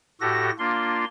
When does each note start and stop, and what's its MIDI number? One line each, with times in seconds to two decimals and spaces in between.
0.21 0.50 45
0.21 0.50 66
0.21 0.50 67
0.21 0.50 69
0.21 0.50 94
0.59 1.05 58
0.59 1.05 62
0.59 1.05 65
0.59 1.05 84